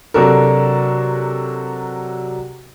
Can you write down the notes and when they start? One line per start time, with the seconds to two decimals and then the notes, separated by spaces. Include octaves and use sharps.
0.14 C3 F#3 D4 F#4 A4 A#4